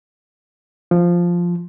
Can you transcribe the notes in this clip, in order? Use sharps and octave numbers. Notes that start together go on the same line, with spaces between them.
F3